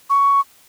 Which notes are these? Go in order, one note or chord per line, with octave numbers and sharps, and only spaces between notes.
C#6